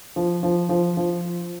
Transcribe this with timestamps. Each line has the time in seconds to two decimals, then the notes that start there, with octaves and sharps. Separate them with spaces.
0.16 F3
0.43 F3
0.69 F3
0.97 F3